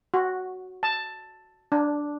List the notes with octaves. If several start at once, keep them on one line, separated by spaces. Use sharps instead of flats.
F#4
A5
D4